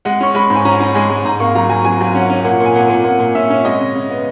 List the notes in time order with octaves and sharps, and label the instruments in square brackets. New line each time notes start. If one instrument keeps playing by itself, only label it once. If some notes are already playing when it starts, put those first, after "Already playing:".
[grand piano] G#3 F#5
C#4 C#6
G#3 B5
G#2
G#5
C#4 A#5
C#4
G#3 G#5
G#3
G#2 A#5
A#3 C#6
F#3 A#5
F#3 G#5
F#3 G#5
F#3
C#4 F#5
C#4
A#2 F#5
A#2
G#5
A#2 F#5
A#2
A#2 F#5
A#2
C#4 E5
C#4
G#3 D#5
C#3
C#3
B3